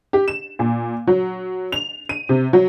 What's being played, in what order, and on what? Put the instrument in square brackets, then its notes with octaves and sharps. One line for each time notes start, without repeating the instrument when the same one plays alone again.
[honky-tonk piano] G4
E7
A#2
F#3
F7
D#7
C3
F#3